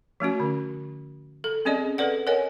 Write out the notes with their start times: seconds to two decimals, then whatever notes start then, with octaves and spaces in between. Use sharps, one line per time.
0.20 F3 A3 C#4 F#4
0.40 D3
1.44 A4
1.65 C4 C#4 G#4 D5 D#5
1.98 A4 B4 D5 F#5
2.27 A#4 C#5 D#5 F#5 G#5